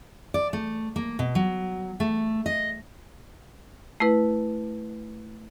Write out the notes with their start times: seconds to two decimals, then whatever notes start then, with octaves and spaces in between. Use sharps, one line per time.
0.34 D5
0.53 A3
0.96 A#3
1.19 B2
1.35 F#3
2.00 A3
2.46 D#5
4.00 A3 E4 B4